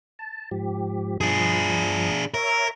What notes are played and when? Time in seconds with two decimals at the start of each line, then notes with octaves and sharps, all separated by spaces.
0.19 A5
0.51 G#2 F3 G4
1.21 G2 F3 D4 G#4 D#6
2.34 A#4 C#5 E5